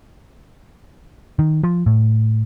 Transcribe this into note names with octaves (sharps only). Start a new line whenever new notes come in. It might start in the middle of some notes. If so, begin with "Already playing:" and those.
D#3
F3
A2